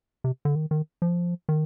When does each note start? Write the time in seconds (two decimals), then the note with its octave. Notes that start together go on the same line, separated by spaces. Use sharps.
0.24 C3
0.45 D3
0.55 D#3
0.71 D#3
1.02 F3
1.49 D#3